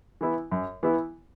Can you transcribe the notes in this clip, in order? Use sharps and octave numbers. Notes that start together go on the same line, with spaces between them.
E3 B3 E4
F#2
E3 B3 E4